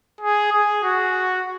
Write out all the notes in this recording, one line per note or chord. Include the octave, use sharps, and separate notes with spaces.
G#4
G#4
F#4